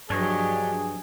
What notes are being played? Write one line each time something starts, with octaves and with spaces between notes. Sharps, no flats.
G2 F3 F#3 D4 G4 G#4 C#5 D#5